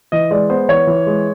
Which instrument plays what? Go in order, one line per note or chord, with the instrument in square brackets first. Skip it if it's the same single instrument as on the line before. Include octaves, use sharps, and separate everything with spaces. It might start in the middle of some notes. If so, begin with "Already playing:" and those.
[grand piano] E3 D#5
G#3 D5
B3 C5
E3 C#5
E3
G#3